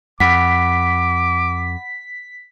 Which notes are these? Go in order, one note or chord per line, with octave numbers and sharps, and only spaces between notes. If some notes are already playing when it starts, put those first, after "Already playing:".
F2 F#5 B5 D6 B6